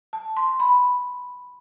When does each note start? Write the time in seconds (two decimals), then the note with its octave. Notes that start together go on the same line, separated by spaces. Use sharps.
0.13 A5
0.37 C6
0.60 B5